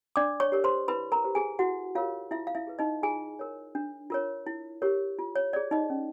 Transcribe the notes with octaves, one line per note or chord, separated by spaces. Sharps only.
D4 D5 D6
C#5 C#6
G4 A#4 C#5
C5 C6
E4 B4 B5
A#4 A#5
G4 C5
G#4 G#5
E4 F#4 F#5
F4 G4 A#4 C#5 F5
E4 F4 E5
F5
E4 E5
G#4 B4
D#4 D#5
F4 G#4 G#5
A#4 C#5
D4
F4 A#4 C#5
E4
G4 A#4 C#5
F4
C#5
G#4 C#5 D5
D#4 D#5
C#4